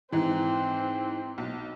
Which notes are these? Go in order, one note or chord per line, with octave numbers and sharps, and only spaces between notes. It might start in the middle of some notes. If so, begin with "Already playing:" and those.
G#2 E3 C4
B1